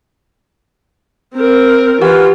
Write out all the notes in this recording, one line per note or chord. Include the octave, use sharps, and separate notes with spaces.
C4 A#4
E3 F4 G4 F#5